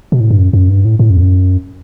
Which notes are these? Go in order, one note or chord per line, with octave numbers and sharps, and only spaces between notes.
B2
A2
G2
F#2
F#2
G2
A2
A2
F#2
E2
F#2